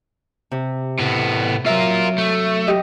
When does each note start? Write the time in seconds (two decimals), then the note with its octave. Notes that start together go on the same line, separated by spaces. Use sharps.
0.51 C3
1.00 A2 B3
1.66 F#3 F4 A#4 E5
2.18 A3
2.67 G4 D#5